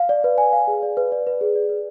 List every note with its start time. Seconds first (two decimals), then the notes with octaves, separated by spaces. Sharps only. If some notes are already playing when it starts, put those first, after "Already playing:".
Already playing: F5
0.09 D5
0.24 B4
0.38 G#5
0.53 F5
0.67 G#4
0.83 D5
0.97 B4
1.12 D5
1.27 B4
1.41 G#4
1.56 D5
1.69 B4